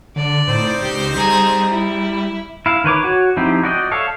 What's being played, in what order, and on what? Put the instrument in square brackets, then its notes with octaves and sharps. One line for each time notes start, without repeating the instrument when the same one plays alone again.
[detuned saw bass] D3 [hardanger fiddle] D5
[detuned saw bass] A2 [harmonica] C4 D#4 C5
[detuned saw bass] C#2 [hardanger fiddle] G4 C6
[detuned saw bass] G3 [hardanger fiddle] G#4 A#5
[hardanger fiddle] E4
[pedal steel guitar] E4 F5
D#3 B4 C#5 D6
F#4 C#5
F3 C4 D#4 E4 G4
F#4 D5 D#5 G5
A4 C#5 E5 F5